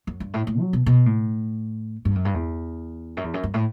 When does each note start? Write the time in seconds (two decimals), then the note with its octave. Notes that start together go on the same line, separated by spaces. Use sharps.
0.07 F#2
0.20 G2
0.34 A2
0.47 A2
0.60 F#3
0.73 B2
0.86 B2
1.06 A2
2.05 G2
2.15 F#2
2.25 G2
2.34 E2
3.17 F#2
3.24 E2
3.34 F#2
3.43 G2
3.54 A2